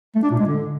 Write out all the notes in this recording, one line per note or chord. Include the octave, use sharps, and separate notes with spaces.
A3
D4
A#2
G#3
D3